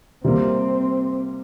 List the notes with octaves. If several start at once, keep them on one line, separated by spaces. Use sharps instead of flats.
C3 G3 A#3 C4